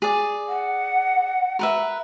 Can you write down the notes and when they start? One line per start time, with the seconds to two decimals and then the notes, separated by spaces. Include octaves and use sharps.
0.02 G#4 D5
0.48 F#5
1.59 A#4 B4 E5